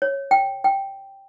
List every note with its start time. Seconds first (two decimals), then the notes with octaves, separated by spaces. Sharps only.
0.02 C#5
0.31 G5
0.64 G5